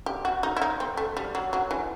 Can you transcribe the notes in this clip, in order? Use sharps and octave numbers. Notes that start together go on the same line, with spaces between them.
G4
F#4
D#4
E4
D#4
C4
A3
G3
F#3
F#3
E3